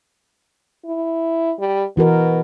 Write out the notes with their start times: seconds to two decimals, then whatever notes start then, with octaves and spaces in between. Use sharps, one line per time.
0.85 E4
1.59 G3
1.97 B2 E3 F#4 A#4